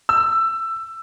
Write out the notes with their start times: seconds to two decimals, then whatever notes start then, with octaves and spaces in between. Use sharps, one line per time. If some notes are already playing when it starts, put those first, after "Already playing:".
0.09 E6